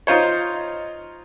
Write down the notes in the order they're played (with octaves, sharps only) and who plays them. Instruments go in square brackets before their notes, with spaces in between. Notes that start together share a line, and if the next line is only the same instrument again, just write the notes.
[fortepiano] D#4 F4 C5 C#5